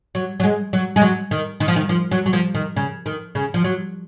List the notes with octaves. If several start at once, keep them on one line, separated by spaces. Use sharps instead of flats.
F#3
F#3
G#3
F#3
G#3
F#3
D#3
D#3
F3
D#3
F3
F#3
F#3
F3
D#3
C#3
D#3
C#3
F3
F#3